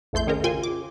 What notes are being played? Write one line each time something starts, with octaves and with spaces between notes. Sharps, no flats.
A#1 F2 A3 C6 G6
D#3 C#4 G#4 A#4
C#3 F4 G5 G#5 C6
D6